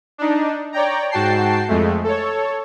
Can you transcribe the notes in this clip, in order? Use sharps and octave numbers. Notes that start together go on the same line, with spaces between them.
D4 D#4
C#5 D5 G5 A#5
G#2 F#4 G5 A5 C7
F2 G#3 A3
A4 C#5